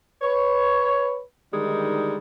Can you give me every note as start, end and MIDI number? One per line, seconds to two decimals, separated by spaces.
0.21 1.20 71
0.21 1.20 73
1.53 2.17 50
1.53 2.17 51
1.53 2.17 55
1.53 2.17 56
1.53 2.17 63